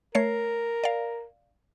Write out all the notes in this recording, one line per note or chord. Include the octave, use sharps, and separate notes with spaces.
A3 A#4 C#5 C7
D5 F5